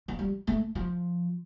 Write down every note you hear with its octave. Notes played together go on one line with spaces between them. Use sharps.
F3
G3
A3
F3